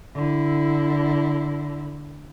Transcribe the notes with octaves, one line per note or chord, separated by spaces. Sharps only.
D3 E4